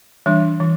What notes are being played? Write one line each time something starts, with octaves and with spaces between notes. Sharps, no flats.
E3 G3 D4
E3